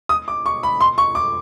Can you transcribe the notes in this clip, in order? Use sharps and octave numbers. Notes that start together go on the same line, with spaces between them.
D#6
D6
C#6
B5
C6
C#6
D6